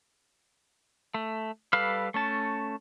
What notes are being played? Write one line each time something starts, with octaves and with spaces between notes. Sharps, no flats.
A3
G3 A4 B4 F5 F6
A3 C#4 A5